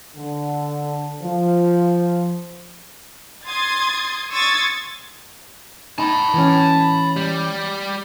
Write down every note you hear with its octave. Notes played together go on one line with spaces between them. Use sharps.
D3
F3
C6 D#6 G#6 A6
C6 C#6 D#6 E6 G#6 A6
D#4 A5 B5
E3 C#4
G3